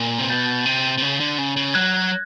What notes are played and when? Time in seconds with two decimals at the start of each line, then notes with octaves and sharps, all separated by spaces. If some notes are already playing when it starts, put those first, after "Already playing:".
Already playing: A#2
0.19 C3
0.30 B2 G6 A6
0.65 C3
0.98 C3
1.02 C#3
1.20 D3
1.38 C#3
1.56 C#3
1.74 F#3 F#6 G#6